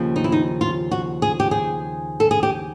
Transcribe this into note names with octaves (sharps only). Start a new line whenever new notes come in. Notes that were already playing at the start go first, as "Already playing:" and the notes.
Already playing: D#2 C#3 F3
D#4
E4
D#4
F4
F#4
G#4
G4
G#4
A4
G#4
G4